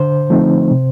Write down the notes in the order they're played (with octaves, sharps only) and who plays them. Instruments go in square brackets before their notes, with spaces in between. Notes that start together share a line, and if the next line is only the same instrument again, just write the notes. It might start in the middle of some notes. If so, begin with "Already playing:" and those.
Already playing: [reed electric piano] D3 C5
F3 A3 C4 D#4
C3